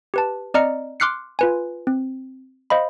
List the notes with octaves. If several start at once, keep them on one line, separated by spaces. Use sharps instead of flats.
G4 B4 A5
C4 D5 D#5 A#5 F6 C#7
C6 D6 F6 F#6 C7 C#7
F4 B4 G#5
C4
C5 D#5 F5 B5